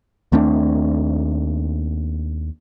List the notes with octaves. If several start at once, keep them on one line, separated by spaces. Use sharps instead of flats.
D#2 A3 C4 D4